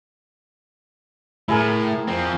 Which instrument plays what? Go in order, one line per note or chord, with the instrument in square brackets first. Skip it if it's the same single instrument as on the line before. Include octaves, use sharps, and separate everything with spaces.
[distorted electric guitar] A2 [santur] E4 G#4 A#4
[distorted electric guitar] F3 C4